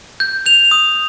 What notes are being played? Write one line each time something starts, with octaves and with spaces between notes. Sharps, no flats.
G6
G6 F7
D#6